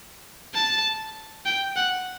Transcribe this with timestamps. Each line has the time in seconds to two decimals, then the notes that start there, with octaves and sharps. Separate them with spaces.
0.54 A5
1.45 G5
1.76 F#5